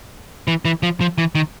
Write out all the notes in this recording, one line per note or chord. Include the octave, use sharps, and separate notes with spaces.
E3
E3
F3
F3
E3
D#3